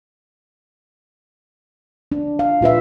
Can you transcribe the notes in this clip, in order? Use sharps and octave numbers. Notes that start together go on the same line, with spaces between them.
D4
F5
A#2 F4 B4 E5